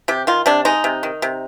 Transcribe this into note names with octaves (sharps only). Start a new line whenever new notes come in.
C3 G4
D#3 F4
C3 D4
G#3 D#4
C3
D#3
C3